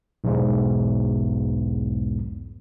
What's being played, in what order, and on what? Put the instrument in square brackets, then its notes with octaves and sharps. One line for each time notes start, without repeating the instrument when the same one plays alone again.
[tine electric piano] B1 E2 G#2